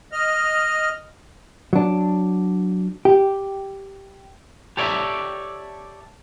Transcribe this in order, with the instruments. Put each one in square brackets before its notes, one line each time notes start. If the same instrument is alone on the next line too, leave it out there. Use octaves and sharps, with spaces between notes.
[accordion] D#5 F6
[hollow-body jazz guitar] F#3 D4
G4
[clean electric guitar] G4 A4 C#5 D5 E5